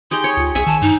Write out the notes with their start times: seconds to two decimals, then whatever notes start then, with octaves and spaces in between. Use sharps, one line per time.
0.11 D#4 G4 G#4 C6
0.24 C#5
0.37 D2 F4
0.55 B1 G#4 E5 G#5 C#6
0.66 D#3 A5
0.82 G2 D#4